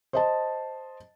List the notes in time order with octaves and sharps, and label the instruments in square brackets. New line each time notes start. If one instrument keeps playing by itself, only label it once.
[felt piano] C5 D#5 A5